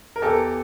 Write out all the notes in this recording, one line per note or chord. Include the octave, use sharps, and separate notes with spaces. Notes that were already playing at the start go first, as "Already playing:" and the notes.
A#4
E2 G4 A4